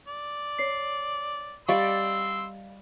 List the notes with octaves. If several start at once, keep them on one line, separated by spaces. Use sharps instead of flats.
D5
C#5 C7
G3 D5 D#5 F5 C6 C#6 E6